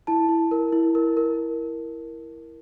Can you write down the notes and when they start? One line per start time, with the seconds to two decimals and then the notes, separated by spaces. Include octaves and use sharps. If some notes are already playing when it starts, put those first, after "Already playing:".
0.07 E4 A5
0.29 E4
0.51 A#4
0.73 E4
0.95 A#4
1.17 A#4